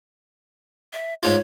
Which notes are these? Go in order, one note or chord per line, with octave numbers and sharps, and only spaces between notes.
E5
G#2 F4 C#5